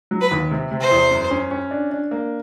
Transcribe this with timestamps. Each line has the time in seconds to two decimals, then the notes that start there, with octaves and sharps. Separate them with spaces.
0.11 F#3
0.21 B4
0.31 D#2
0.51 C3
0.71 C3
0.81 C5
0.91 E2
1.11 F#2
1.31 C#4
1.51 C#4
1.71 D4
1.91 D4
2.11 A#3